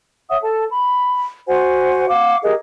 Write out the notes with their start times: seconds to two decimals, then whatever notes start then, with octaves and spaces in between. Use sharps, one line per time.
0.29 C#5 E5 F#5 D#6
0.43 A4 A5
0.71 B5
1.47 F#4 C5 F#5 G#5
2.09 F5 F#5 D6
2.44 G4 G#4 A#4 D#5